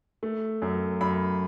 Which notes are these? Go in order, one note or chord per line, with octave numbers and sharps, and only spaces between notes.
A3
F#2
F#2 B5